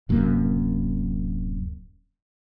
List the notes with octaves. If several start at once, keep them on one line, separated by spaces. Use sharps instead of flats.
D1 F#2 C3 A#3